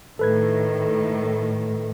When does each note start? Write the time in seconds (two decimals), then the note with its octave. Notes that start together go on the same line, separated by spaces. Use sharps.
0.19 A2 D#3 A4 B4 G#6